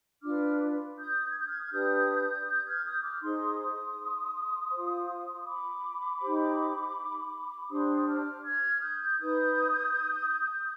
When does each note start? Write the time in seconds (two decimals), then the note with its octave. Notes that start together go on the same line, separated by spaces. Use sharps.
0.22 D4 F4 B4 D6 F6
0.98 D#6 G6
1.23 G6
1.30 G#6
1.38 D#6 G6
1.47 F6 G#6
1.58 D#6
1.65 F6
1.72 D4 G4 B4 D#6 G6
2.47 D#6 G6
2.65 F6 G#6
2.84 D#6 G6
3.02 D6 F6
3.22 D#4 G#4 C5 C6 D#6
3.59 C6 D#6
4.71 F4 C5
5.45 B5 D6
6.21 D#4 G4 C5
7.70 D4 G4 C5 C6 D#6
7.97 D#6
8.07 D6 F6
8.45 F6 G#6
8.82 D#6 G6
9.20 D#4 B4 D#6 G6